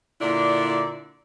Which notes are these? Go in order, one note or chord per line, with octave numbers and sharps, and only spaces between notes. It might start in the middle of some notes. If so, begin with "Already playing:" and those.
A#2 D3 D4 E4 D5